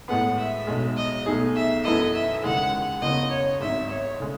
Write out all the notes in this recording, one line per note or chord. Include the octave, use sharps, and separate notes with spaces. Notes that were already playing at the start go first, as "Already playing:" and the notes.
A2 G#3 B3 F#5
E5
B1 B2 G#3
D#5
B1 B2 A3 D#4 G#4
E5
F#2 E3 B3 E4 A4 D#5
E5
D#2 C#3 E3 G#3 F#5
F#1 E2 C#3 D#5
C#5
G#1 G#2 F#3 E5
C#5
C#3 G#3